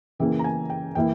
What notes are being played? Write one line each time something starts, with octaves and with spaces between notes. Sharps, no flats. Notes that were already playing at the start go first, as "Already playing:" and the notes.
C#3 E3 A#3 G5
A#5
G#5
G5
E3 A#3 E4 G5